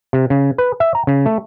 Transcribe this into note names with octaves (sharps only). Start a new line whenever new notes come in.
C3
C#3
B4
E5
A#5
C#3
A3